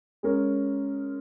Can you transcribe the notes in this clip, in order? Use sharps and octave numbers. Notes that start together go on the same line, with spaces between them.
G#3 C#4 A#4